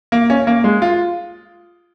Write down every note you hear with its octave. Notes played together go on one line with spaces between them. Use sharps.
A#3
C#4
A#3
G#3
F4